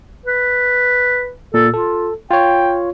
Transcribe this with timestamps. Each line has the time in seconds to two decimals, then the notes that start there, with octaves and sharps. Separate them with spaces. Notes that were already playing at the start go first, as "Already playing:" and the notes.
0.26 B4
1.54 A#2 A4
1.74 F4 A4
2.31 F4 C#5 G5